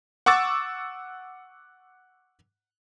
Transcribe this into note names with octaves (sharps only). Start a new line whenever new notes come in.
F#5 C#6 D6 E6 A6